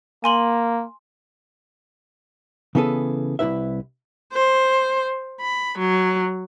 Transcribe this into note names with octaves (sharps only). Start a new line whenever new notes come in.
A#3 G#5 C6 F#7
C#3 E3 B3 G#4 A4 B4
C2 F#2 E4 B4 E5
C5
B5
F#3